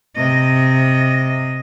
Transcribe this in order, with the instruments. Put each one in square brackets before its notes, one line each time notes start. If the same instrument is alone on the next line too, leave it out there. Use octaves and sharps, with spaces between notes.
[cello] C3 D#5